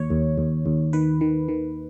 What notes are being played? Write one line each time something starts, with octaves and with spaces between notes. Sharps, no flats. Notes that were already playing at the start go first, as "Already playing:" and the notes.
Already playing: D#2 C#5
D#2
D#2
D#2
D#3 B4
D#3
D#3